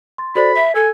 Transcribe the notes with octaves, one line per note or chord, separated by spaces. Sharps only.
C6 A6
F#4 A4 C5 D5 B5
E5 B6
A4 G#5 E6